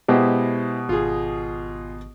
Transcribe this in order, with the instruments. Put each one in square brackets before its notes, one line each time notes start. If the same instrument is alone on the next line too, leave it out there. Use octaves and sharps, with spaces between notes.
[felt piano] B2 G4 [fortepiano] G#3 E4 C5
[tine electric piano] G#1 [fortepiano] F4 G#4